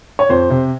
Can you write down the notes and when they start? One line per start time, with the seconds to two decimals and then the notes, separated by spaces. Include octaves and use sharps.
0.19 C#5
0.29 F2 C5
0.50 C3